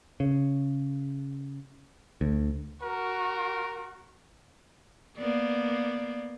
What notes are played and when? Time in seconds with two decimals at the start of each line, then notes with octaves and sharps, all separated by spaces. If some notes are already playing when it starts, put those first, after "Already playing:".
0.20 C#3
2.21 D2
2.83 F#4 A#4
5.17 A#3 B3 D5